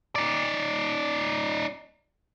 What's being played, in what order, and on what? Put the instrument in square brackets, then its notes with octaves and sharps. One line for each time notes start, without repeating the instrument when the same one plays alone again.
[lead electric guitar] D#4 D5